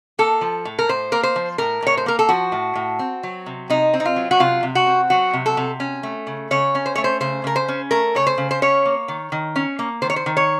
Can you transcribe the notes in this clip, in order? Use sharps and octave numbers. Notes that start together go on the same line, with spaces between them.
A#3 A4
F3
A2
A#4
A2 C5
A#3 A#4
C5
F3
A2 A#4
A2 C#5
C5
A#3 A#4
A4
F3 F#4
A2
A2
C4
F#3
C3
C3 D#4
C4
D#4
F4
F#3
F#4
C3 F4
C3
F#4
C4
F#3 F#4
C3
A4
C3
C#4
A3
C#3
C#3 C#5
C#4
C5
A3 C#5
C5
C#3 C5
C#3 A#4
C5
C#4
A3 A#4
C#3 C#5
C5
C#3
C5
C#4 C#5
A#3
D#3
D#3
C#4
A#3
D#3 C5
C#5
C5
D#3
C#5